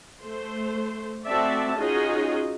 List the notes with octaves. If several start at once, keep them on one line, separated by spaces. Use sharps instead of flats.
A3 C5
A3 C4 F#4 D5 E5 A5
C#4 D#4 F4 F#4 G#4 D#5